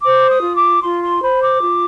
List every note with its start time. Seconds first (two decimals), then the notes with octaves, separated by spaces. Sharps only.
0.03 C5 D6
0.30 D#6
0.43 F4
0.55 D6
0.82 F4 C6
1.03 C6
1.22 C5 B5
1.42 D6
1.61 F4